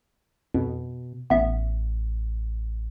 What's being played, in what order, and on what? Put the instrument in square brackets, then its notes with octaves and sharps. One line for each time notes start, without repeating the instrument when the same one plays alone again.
[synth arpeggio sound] F2 [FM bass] B2
[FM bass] A1 [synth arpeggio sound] B3 E5